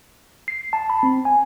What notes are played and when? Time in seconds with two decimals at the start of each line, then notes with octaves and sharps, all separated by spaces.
0.48 C7
0.73 A5
0.90 B5
1.03 C4
1.25 G#5